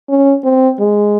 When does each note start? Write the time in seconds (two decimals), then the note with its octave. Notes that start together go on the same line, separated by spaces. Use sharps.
0.09 C#4
0.44 C4
0.80 G#3